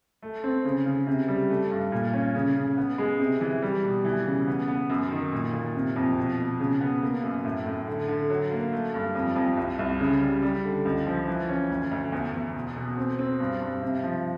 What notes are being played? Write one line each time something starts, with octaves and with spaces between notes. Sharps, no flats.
A3
C4
C#3
C#3
C3
G3
A3
G2
A#2
C#4
C#3
C#3
B3
G#3
C3
E3
G3
B2
E3
C#3
B3
B3
F#2
D#3
A#2
A#2
C3
F2
B2
B2
C#3
B3
A#3
F#2
A2
A2
D3
D3
F#3
A#3
A3
G2
F2
F2
C2
C2
C#3
G3
G3
D3
C#2
F3
E3
C#4
D2
D2
E2
E2
B2
B2
C4
C4
G2
G2
C3
F3